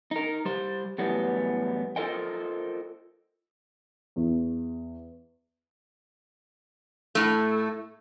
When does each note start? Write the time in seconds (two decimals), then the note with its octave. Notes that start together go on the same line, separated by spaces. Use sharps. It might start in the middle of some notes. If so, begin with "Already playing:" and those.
0.11 D#4 A#4
0.45 G3 C5
0.98 E2 A2 F#3 G3 B3
1.96 F4 A4 A#4 C5 D#5 G5
4.16 E2
7.15 A2 A3